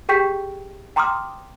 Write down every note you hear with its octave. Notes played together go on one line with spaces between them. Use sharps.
G4 G#4 G5 C#6 G6 B6
G5 A#5 C6 D6 D#6 F6